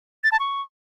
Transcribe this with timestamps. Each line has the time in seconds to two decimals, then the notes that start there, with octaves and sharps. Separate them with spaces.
0.24 A6
0.32 A5
0.40 C#6